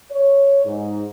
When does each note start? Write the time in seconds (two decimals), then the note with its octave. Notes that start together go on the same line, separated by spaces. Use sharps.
0.12 C#5
0.66 G#2